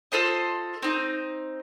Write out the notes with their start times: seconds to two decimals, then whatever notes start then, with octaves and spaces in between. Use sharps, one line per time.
0.12 F4 A4 C5 D#5
0.82 C4 D#4